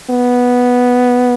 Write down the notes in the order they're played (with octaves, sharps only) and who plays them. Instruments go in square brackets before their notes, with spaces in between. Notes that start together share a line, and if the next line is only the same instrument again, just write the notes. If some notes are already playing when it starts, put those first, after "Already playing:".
[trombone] B3